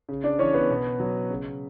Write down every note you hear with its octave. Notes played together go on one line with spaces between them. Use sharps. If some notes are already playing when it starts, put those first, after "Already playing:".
C#3
D4 D5
E3 C#4 C#5
B3 B4
B2
F#3
C#3